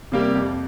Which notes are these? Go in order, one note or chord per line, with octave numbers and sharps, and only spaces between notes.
C3 G3 A#3 G4
F2